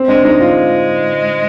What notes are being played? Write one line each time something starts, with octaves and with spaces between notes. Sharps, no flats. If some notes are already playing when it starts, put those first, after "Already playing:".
Already playing: C4
G#3 D4
G#3 D#4
G#3 F4